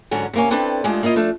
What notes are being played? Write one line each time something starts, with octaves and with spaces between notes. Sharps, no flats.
G#2 D3 F#3 C#4
C3 A#3 C#4
C4 D4 E4 A4 B4 G5
G#3 A3 D4 F4 G4 G#4
A#3 E4 F4 D#5
F3 A3 D4